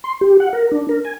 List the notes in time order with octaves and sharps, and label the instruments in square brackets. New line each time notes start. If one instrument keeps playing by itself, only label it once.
[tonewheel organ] C6
G4
F#5
A#4
D4
A#4
G#5